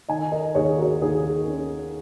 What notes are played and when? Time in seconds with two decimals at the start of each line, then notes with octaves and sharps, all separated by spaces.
0.09 D#3 D#5 G#5
0.31 A#4 D#5
0.55 D#2 G#4 C#5
0.78 F#4 A#4
1.02 D#2 D#4 G#4
1.48 C#4